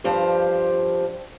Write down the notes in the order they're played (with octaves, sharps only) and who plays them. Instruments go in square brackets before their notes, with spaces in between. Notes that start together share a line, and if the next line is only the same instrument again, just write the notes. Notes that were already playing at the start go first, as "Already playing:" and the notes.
[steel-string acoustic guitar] G2 F3 G4 C5